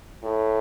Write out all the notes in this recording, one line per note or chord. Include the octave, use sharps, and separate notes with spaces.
A2